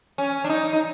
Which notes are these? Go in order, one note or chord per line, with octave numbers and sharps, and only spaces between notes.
C#4
D4
D#4
D#4